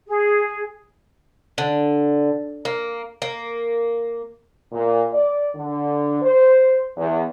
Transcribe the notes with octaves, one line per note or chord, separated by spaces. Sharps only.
G#4
D3
A#3
A#3
A#2
D5
D3
C5
E2